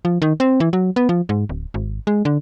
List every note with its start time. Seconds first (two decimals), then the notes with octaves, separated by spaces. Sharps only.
0.05 F3
0.22 D#3
0.40 C4
0.60 E3
0.73 F#3
0.96 B3
1.09 F3
1.29 G#2
1.49 D1
1.74 G#1
2.07 G#3
2.25 D3